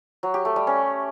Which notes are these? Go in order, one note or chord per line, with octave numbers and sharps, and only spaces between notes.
F#3
G4
A3
G3
C#4